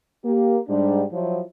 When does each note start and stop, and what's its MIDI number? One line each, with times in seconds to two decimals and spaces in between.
0.24 0.57 58
0.24 0.57 67
0.68 1.03 44
0.68 1.03 55
0.68 1.03 62
1.13 1.40 53
1.13 1.40 54
1.13 1.40 64